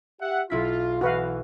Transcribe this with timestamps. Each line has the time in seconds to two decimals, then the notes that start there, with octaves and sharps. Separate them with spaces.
0.21 G4 E5 F#5
0.50 B1 E4 F4 B6
1.01 E3 F#4 B4 F5